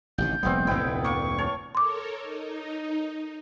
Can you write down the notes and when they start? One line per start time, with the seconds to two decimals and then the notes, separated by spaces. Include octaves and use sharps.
0.18 A1 C3 D#3 G6
0.43 F1 A#1 G3 B3 C4
0.67 F1 D2 A#2 B3 E4 G5
1.04 A#3 C#6
1.38 C#5 A5
1.75 A4 A#4 C#5 C6 D6
2.21 D#4